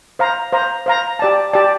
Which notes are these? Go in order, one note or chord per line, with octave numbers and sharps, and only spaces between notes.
C5 F5 A#5
C5 F5 A#5
C5 F5 A#5
G4 D5 A5
G4 D5 A5